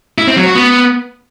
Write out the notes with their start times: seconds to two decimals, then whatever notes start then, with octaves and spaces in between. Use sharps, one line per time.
0.18 E4
0.28 C4
0.37 F#3
0.46 F#4
0.55 B3